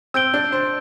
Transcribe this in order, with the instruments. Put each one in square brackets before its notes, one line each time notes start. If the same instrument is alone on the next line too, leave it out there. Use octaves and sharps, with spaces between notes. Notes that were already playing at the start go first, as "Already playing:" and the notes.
[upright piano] C4 [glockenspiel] E6 G6 D7 G7
[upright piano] D4
C5